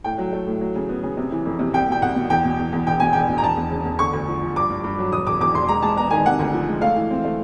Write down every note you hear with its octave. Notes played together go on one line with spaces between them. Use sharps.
A2 G5
F#3
A3
A2
F#3
C#3
B3
C#3
C3
E3
F2
C3
C2 G5
B2 G5
C2 F#5
B2
E2 G5
B2
E2
E2
E1 G5
B2 G#5
E1 G5
B2
A#5
E1 A5
E2
C#3
E2
D3 C#6
D2
F3
F3
G2 D6
G2
G2
F#3
E1 D#6
E1 D6
E2 D6
E1 C6
G#3 A#5
G#3 A5
B3 A#5
D#3 G#5
C3 F#5
D2
F3
G#3
A3 F5
E3
C4
A3